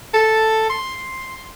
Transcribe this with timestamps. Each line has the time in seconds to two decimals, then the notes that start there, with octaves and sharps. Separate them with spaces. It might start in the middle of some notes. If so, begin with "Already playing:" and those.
0.14 A4
0.69 C6